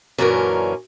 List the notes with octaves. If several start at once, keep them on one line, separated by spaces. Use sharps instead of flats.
F#2 A#2 D3 E3 C#4 A#4